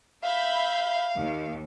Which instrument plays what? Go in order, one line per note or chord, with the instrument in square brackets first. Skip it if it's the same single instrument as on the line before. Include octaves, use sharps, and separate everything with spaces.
[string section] E5 B5 G6 [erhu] F5
[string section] D#2